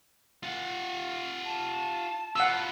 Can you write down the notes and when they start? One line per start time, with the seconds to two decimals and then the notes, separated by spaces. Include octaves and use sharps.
0.43 F4 F#5
1.44 A5
2.36 B3 F4 F#5 E6